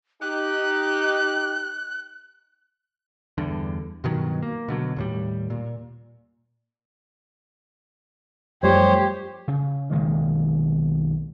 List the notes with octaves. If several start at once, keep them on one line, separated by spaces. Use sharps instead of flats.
D#4 G4 F#6
E2 G2 D3
G2 B2 D#3 F#3
A#3
B2 D3 F#3
D#2 A2 G3
A#2
F#2 F3 G3 A3 G4 C5 C#5
C#3
B1 D#3 G#3 A#3